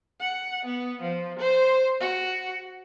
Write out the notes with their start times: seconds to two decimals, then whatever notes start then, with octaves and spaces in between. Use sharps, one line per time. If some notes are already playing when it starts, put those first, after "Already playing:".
0.21 F#5
0.65 B3
1.02 F3
1.39 C5
2.01 F#4